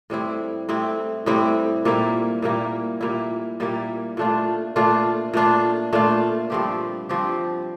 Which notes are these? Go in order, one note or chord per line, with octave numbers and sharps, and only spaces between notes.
A2 G3 C4 E4
A2 G3 C4 E4
A2 G3 C4 E4
A#2 G3 A#3 E4
A#2 G3 A#3 E4
A#2 G3 A#3 E4
A#2 G3 A#3 E4
A#2 A3 D4 F4
A#2 A3 D4 F4
A#2 A3 D4 F4
A#2 A3 D4 F4
G2 F3 C4 G4
G2 F3 C4 G4